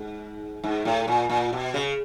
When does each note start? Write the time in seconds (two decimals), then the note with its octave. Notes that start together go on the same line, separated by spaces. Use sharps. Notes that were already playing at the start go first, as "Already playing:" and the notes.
Already playing: G#2
0.64 G#2
0.85 A2
1.08 A#2
1.30 A#2
1.53 B2
1.74 C#3